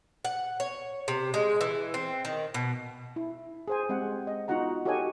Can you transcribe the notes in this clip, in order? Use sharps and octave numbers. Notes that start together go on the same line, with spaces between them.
F#5
C#5
C3
G#3
E3
C4
D#3
B2
E4
G#4 C5 G#5
G#3 C4 G4 F#5
D#5
B3 D#4 F4 F#4 F#5 A#5
F#4 G4 A4 C#5 D#5 G#5